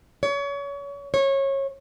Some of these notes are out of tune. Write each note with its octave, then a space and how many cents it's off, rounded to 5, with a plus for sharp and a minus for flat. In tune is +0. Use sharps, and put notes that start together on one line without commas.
C#5 +30
C#5 -25